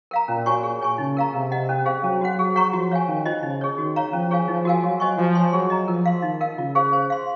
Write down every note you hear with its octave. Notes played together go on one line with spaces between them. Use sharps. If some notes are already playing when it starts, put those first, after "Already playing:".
A#4 F5 A#5
A#2 C#4
F#4 C#5 G#5 C#6
G#4
C#5 G#5 C#6
C#3 D#4
A#4 F5 A#5
C3 A#4
D#5 F#5
C#4
G#4 C5 F5
F#3 C#4
F#4 C5 F#5
F#3 G#4
C#5 F#5 A#5 C#6
F3 F#4
C#5 F5 G#5
D#3 C#4
F4 C5 D#5
C#3 D#4
G#4 C#5
D#3 F#4
C#5 F5 A#5
F3 C#4
G#4 C#5 F5 G#5
F3 D#4
F#4 A#4 F5 G#5
F#3 F#4
C5 D#5 G#5 C#6
F3 F#4
C#5 G#5 C6
F#3 G#4
D#5 A#5
F3 A#4
F5 C6
D#3 D#4
A#4 F5
C#3 F4
G#4 C5 F5
C5
F5 C6